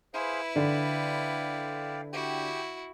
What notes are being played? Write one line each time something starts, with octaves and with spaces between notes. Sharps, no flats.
E4 G#4 B4 C5 F5
D3 D5 F5 G5
E4 F#4 G4 G5